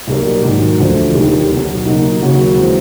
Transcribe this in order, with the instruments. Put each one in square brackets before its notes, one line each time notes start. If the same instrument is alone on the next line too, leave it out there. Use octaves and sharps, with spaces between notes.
[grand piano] B1 A#2 G3 A#3
G#2 D#3 F#3
E1 D2 D3 F3 A3
D#2 D#3 G3
B1 B2 F#3
C#3 F#3 A#3 D#4
D#2 C#3 F#3 A#3
E3 G#3 C4